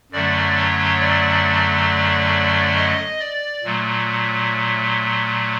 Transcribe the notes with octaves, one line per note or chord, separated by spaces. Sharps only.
F#2 D3 F#3 A3 D5
C#5
D5
D#5
D5
A#2 F#3 A3